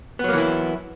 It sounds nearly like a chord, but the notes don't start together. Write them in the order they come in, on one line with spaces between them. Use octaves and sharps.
B3 F#3 A#3 E3 E4